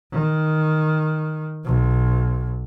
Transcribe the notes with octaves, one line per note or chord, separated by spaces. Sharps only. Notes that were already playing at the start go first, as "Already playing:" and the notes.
D#3
B1